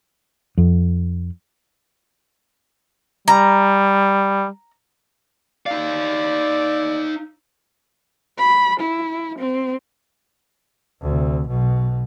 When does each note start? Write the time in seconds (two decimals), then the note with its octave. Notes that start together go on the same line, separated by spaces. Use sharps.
0.57 F2
3.28 G3 A#5
5.66 D#4 D5 F5
8.38 B5
8.80 E4
9.39 C4
11.02 D2 C3
11.48 B1 B2